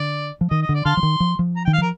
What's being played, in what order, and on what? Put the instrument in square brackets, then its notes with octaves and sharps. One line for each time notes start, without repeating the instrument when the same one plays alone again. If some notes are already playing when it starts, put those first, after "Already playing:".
Already playing: [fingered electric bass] D3 [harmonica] D5
[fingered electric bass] F3
[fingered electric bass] D#3 [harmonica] D#5
[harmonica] D#5
[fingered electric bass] D3
[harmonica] D5
[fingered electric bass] D3 [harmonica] F5 A5 C6
[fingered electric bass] F3
D#3
F3
F3
[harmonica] A#5
[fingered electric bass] D#3 [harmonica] G5
[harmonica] F5
[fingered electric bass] F3 [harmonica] A#4